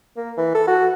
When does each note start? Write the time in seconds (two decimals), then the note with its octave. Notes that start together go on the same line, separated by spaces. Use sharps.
0.17 A#3
0.37 E3
0.55 A4
0.68 F#4